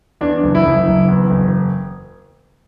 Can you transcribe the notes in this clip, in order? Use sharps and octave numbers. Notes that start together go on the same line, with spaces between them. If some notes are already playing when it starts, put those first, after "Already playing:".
E2 D4
F#1
E4
F#1
F#1
E2
F#1